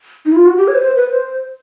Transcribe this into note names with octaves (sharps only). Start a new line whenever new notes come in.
D#4
E4
F4
F#4
G4
C#5
B4
C5
B4
C5